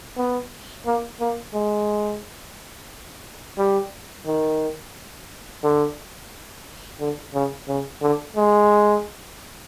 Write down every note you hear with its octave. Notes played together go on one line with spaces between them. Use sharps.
B3
A#3
A#3
G#3
G3
D#3
D3
D3
C#3
C#3
D3
G#3